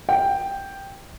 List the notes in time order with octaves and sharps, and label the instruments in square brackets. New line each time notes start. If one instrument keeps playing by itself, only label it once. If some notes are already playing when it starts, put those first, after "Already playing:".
[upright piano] G5